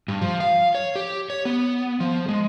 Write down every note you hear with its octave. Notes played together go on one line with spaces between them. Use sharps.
G2
F3
F5
C#5
G4
C#5
B3
F3
G#3